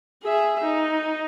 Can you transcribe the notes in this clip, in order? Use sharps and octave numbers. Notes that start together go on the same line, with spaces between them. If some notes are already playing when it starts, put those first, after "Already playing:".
G#4 E5
D#4